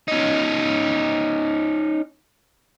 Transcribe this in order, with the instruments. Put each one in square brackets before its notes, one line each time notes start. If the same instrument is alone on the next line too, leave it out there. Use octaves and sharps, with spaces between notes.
[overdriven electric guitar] C#4 D#4